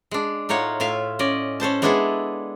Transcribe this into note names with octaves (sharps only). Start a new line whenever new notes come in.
G#3 D4
A2 D#4 F4 C#5 F#5
A2 F4 E5 F5
C#4 D5 D#5
C#4 A4 C5 A5
G#3 B3 D4 E4 G#4 A4